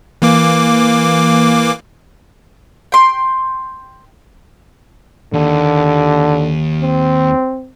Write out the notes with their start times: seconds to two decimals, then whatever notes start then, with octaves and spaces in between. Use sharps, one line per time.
0.22 E3 A#3 D6
2.92 G5 C6
5.33 D#2 D3
6.82 C4